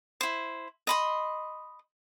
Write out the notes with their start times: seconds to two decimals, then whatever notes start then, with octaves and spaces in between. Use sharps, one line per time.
0.21 E4 C5
0.87 D#5 B5 C6